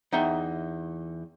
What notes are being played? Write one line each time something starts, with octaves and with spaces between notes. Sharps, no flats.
E2 D#4 E5 G5